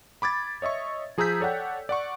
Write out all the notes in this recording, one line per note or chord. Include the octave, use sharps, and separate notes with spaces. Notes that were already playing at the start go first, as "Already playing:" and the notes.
B5 D6 G#6 A6
C#5 D#5 E5 C#6
F3 G#4 A#5 E6 G6 B6
A4 C#5 D5 F#5 G5
D5 F#5 C#6